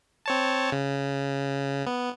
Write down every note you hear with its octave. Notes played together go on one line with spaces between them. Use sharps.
C4 C#5 A5
C#3
B3